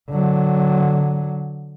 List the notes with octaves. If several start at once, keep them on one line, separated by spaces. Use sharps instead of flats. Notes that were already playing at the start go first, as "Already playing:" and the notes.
D3 F#3